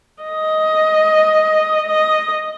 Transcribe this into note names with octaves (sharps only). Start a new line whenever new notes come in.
D#5
D#5